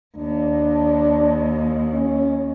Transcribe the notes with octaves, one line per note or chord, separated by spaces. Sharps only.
D#2 D4
C#4